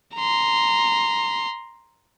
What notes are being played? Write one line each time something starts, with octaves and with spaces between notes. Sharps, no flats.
A#5 C6